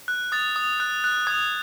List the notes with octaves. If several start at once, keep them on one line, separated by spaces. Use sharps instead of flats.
F#6
D#6 A6
D#6
F#6
F#6
D#6 G#6